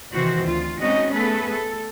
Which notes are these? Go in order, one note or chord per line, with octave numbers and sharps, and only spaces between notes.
C3 D#3 E3 C4 F#4 C5
D2 F4
G#3 C4 C#4 D#4 F#4 D#5
A3 B3 G#4 A4 B4
A4